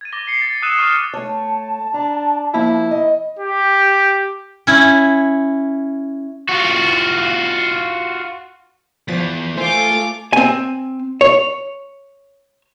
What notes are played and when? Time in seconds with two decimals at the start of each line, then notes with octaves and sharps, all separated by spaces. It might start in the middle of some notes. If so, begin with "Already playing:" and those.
0.01 G#6 A6 D#7
0.12 D6 A#6 G7
0.26 A#6 C7 C#7
0.42 D6 A6
0.62 D#6 E6 F#6 D#7 E7
0.79 C#6 D6 F6 C#7 D#7
1.14 A3 C#5 A5
1.94 D4 A#5
2.54 F3 A#3 E4
2.91 D#5
3.39 G4
4.67 C#4 E4
6.49 F4 F#4
9.08 E2 F3 A6 B6
9.57 A3 F4 A4 C5 G#5 D6
10.33 C4 G#5
11.21 C#5